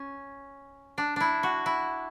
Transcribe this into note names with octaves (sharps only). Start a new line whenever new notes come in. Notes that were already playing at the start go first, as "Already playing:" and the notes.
Already playing: C#4
D4
D4 E4
F#4
E4